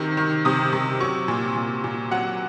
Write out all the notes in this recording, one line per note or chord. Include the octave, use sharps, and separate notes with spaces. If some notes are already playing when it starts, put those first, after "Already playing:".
Already playing: C3 D#3 F#3
D#3
C3 D#6
C3
F#3 C#6
A#2
A#2
A#2
F#3 F#5